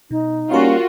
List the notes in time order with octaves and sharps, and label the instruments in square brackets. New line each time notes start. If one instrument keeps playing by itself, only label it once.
[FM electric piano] B2 [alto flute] D#4
[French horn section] G3 A#3 C#4 [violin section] F4 F#4 [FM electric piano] A#4 F5